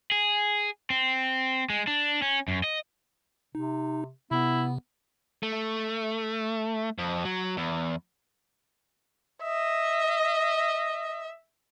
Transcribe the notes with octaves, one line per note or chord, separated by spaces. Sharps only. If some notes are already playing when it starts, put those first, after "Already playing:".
G#4
C4
G#3
D4
C#4
F#2
D#5
C3 D#4
C3 B3 E4
A3
F2
F#3
E2
D#5 E5